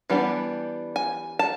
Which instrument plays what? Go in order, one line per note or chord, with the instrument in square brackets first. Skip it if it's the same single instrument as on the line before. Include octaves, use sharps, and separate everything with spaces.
[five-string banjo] E3 G3 B3 D4
G#5
A5